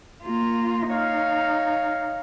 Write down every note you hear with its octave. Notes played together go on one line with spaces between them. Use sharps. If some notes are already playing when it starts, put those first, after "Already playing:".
A#3 F4
D#4 C#5 F5